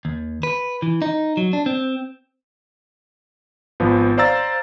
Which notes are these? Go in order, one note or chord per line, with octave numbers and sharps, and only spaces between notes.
D#2
B4
E3
D#4
F#3
D4
C4
G#1 F3 B3
C5 D5 F5 A#5 E6 A6